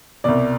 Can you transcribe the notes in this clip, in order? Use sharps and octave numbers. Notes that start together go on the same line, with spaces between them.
C2 B2 D5